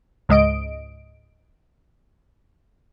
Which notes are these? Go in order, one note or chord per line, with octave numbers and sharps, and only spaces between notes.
C#2 G#2 D#5 D7